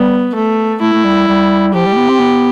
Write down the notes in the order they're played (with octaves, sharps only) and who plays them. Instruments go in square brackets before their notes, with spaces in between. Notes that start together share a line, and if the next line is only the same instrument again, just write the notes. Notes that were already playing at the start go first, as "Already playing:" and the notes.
Already playing: [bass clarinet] G3 [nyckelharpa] B3
[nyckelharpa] A3
[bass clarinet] A3 [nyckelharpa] E4
[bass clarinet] A3
G3
G3
[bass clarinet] F3 [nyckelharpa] G4
[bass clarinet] G3
A3
B3
C4
B3